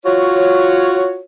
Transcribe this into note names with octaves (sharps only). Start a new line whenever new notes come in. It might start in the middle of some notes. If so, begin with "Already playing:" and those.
F4 F#4 C#5